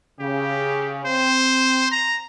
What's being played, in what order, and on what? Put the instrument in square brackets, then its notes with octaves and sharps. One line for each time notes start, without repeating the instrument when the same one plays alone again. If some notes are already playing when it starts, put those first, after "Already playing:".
[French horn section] C#3 [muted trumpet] G4
[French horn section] C4 [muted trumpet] C5
[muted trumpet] A#5